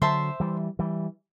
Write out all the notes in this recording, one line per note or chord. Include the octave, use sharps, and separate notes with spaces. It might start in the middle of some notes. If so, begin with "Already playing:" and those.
D3 F#3 C5 E5 A5 C6
E3 G3
E3 G3